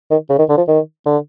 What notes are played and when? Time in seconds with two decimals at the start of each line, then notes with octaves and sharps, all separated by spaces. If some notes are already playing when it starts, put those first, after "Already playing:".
0.11 D#3
0.29 C#3
0.39 D#3
0.49 D3
0.57 F3
0.68 D#3
1.06 D3